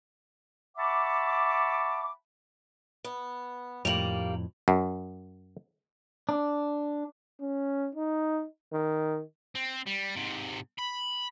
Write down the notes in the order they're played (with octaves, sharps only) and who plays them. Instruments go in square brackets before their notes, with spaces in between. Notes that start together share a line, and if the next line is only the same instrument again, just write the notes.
[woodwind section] E5 F#5 A5 B5 C#6 D6
[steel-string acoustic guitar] B3
[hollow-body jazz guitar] F2 A2 [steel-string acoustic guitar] G3 A#3 [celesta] F7 F#7
[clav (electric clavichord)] F#2
[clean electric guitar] D4
[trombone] C#4
D#4
D#3
[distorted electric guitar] C4
G3
G#2 C3
B5